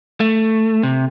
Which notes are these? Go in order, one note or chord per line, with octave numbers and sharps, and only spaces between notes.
A3
C3